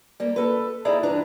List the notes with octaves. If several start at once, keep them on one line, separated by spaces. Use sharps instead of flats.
G3 A#3
A4 B4
D#2 D#4 E4 G#4 D5 A#5
G2 E3 D4 B4 A#5